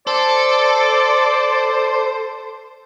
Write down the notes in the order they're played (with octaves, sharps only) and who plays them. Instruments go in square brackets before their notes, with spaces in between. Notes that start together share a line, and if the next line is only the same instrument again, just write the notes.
[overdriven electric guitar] A4 [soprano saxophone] C5 [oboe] D5